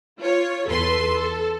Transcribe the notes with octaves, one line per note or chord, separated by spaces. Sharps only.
F4 C#5
E2 A4 B4 C6
A4